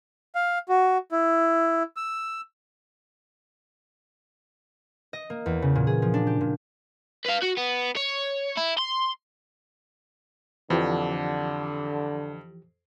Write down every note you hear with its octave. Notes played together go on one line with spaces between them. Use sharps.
F5
F#4
E4
E6
D#5
A#3
E2
C#3
A#2
G#4
F3
D4
G4
A#2
B4 F5
F#4
B3
C#5
E4
C6
F2 D3 E3 F3 G4